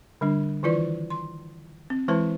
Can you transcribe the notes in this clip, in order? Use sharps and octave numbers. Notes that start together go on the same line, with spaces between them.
D3 G3 D4
D#3 E3 E4 F4 B4 D5
C6
C4
E3 G#3 E4 B4 C5 A5